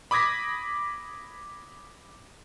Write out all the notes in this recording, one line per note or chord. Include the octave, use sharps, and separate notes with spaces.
B5 D6 D#6 G#6 A#6 B6